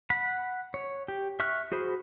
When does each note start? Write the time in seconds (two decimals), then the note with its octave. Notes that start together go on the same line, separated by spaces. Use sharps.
0.10 F#5 B5
0.74 C#5
1.08 G4
1.40 E5 C#6 F6 F#6
1.72 F#4 G#4 C5 B5